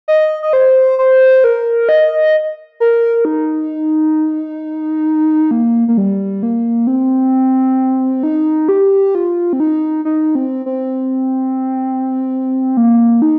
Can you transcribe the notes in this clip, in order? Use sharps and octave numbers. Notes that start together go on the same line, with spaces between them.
D#5
D#5
C5
C5
A#4
D#5
A#4
D#4
A#3
A#3
G3
A#3
C4
D#4
G4
F4
C4
D#4
D#4
C4
C4
A#3
D#4